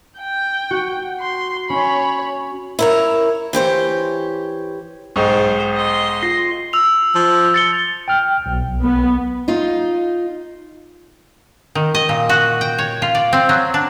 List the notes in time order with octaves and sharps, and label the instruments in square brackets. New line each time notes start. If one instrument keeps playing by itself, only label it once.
[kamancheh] G5
[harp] F#4
[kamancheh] C6
[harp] C#4 [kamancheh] C#5 B5
[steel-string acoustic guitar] E4 A#4 C#5
E3 G4 C5 C#5
[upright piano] B1 G#2 [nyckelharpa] C5 [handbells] G5 C#6
[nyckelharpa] D#5 C6
[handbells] F4 A#6 C7
[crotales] E6 F7
[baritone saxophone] F3
[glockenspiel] A6 C#7 G7
[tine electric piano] G5 F6
B1
[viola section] B3
[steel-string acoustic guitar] D#4 F4
[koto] D#3
D#5
A#2
F#4
G5
C#5
F4
D5
C4
F#3
D4